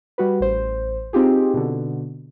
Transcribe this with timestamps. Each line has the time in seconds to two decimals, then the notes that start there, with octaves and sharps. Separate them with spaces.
0.18 G3 F#4 B4
0.40 A1 C5
1.13 C4 D#4 F4 G4 G#4
1.54 B2 D3